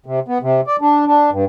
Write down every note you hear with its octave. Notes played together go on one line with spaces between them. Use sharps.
C3
B3
C3
D5
D4
D4
G2